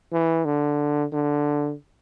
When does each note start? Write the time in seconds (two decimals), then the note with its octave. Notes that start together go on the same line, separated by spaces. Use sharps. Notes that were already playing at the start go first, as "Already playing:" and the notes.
0.12 E3
0.45 D3
1.12 D3